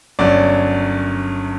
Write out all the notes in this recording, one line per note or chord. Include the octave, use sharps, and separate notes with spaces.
G1 F#2 F#3 D5